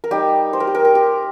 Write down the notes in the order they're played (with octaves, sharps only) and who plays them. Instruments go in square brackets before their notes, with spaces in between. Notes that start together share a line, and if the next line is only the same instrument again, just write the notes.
[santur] A#4
G3 D#4 G4
C5
A#4
G4
A#4
A#4
G4